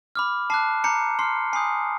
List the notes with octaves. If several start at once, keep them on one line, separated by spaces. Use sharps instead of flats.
B5 D6 F6
A5 D6 F#6 C7
A#5 D6 G6 C#7
C6 F6 C7
G#5 B5 D#6 G6 C7